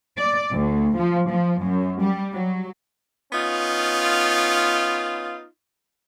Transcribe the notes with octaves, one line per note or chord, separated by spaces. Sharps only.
D5
D2
F3
F3
F#2
G3
F#3
B3 C#4 D#4 F4